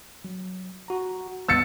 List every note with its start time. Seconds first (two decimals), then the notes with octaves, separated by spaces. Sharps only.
0.24 F#3
0.88 F#4 A#5
1.48 B3 E6 A6 C#7